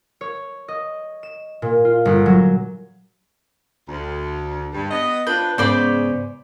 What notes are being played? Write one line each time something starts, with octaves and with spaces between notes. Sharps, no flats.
C#5
D#5
E7
A#2
F4
G1
F#3
D2
G2
B3 D#5
F3 D4 B4 G6
G#2 C#3 B3 C5 D5 B5 G6